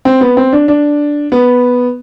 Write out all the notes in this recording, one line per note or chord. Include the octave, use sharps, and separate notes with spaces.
C4
B3
C4
D4
D4
B3